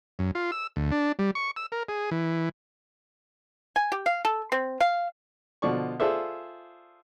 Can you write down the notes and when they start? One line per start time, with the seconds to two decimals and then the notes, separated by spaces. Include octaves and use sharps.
0.19 F#2
0.35 F4
0.52 E6
0.76 D2
0.92 D4
1.19 G3
1.35 C#6
1.56 E6
1.72 A#4
1.88 G#4
2.11 E3
3.76 G#5
3.92 G4
4.06 F5
4.25 A4
4.52 C4
4.81 F5
5.62 B2 D3 F3 D5 C#6
6.00 F4 G#4 A4 C5 D5 E5